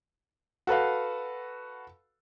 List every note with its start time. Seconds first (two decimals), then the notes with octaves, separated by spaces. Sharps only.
0.67 F#4 A4 B4 F5